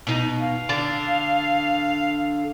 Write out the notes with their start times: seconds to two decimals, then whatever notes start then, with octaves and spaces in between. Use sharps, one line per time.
0.07 B2 D#4
0.39 F5
0.69 D3 D5